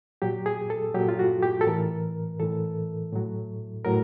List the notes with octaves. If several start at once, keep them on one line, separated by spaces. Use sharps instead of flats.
A#2 F#3 G4
G#4
A4
A#2 F#3 G4
F4
F#4
G4
A4
A2 E3 A#4
A2 E3 A4
A2 F#3
A2 F#3 A#4